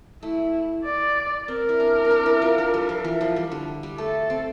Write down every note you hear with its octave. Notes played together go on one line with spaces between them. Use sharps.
A3 E4
D5
C4 A#4
E4
D4
C4
D4
E4
F4
D4
G3
F3
E3
F3
G3
D3
G3
A3 A4
C4